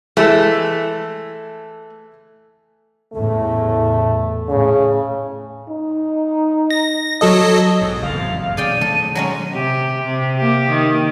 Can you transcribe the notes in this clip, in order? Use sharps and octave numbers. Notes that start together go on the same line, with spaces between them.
E3 G#3 A3 A4
E2 A2 C#3 A3
A2 C#3
D#4
A#6
F#3 A4 D#5
B1 E2 G#2
F#1 F2 G#2 F5
A1 E3 C4
B2 C4 G#4 D5 G5 D#7
D#3 A3 A4
F#3 G#3 C#4
C3 G4
C3
A#3 G4
D#3